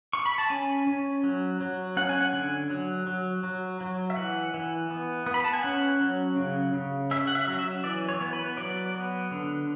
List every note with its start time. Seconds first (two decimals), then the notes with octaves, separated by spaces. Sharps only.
0.13 C#6
0.26 B5
0.38 A5
0.49 C#4 G#5
0.87 C#4
1.24 F#3
1.61 F#3
1.97 C#4 F#5
2.09 G#5
2.21 F#5
2.33 D3 G#5
2.70 F#3
3.07 F#3
3.43 F#3
3.81 F#3
4.10 E5
4.16 E3 F#5
4.54 E3
4.90 B3
5.26 B3
5.34 B5
5.44 A5
5.53 G#5
5.63 C#4 F#5
6.01 F#3
6.37 C#3
6.74 C#3
7.11 C#4 E5
7.27 F#5
7.35 E5
7.48 F#3
7.59 E5
7.84 E3 D5
8.09 C#5
8.21 B3
8.33 B4
8.57 F#3 D5
8.94 B3
9.31 D3